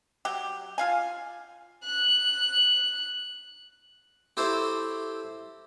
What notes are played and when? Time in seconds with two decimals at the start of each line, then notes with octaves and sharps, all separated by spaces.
0.25 F#3 G4
0.78 F4 F5 G#5
1.84 F#6
4.37 C4 E4 G4 A4 C5 C#5